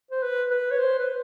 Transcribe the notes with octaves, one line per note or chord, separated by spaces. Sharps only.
C5
B4
B4
C#5
C5
B4